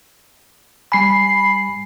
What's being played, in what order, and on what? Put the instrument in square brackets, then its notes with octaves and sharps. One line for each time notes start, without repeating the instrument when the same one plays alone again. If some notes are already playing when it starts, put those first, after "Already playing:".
[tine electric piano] G3 G#5 [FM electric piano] B5 C7